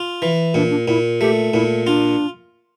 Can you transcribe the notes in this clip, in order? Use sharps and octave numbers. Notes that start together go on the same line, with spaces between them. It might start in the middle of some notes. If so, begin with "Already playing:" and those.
Already playing: F4
E3
A#2 D4
D4
A#2 E4
A3 G4
A#2 E4
D4 F4